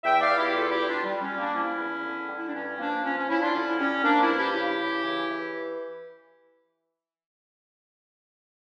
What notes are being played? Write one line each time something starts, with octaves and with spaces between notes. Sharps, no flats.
E2 E5 G5
D5 F5
E2
E4 G4
G3 F4 A4
E4 G4
G3
D4 F4
G3
C#4
G3
A#3 D4
F3 C#4 E4
E2
D3
G3
E4
D4
G2 C#4
F3 A#3 D4
F3 C#4
C#4
F3 C#4 E4
D4 F4
D3 C#4 E4
G3 C#4
F3 A#3 D4
C#4 E4
G2
E4 G4
C#3 E4 G4
C#3
E3
E3